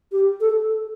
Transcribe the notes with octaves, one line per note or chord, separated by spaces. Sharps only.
G4
A4